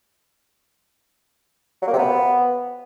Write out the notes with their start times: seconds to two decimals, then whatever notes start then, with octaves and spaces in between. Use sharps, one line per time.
1.82 F#3
1.87 A#3
1.93 C3
1.98 B3